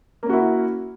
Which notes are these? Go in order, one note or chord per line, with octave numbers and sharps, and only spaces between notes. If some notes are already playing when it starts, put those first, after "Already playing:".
A#3 C#4 E4 F#4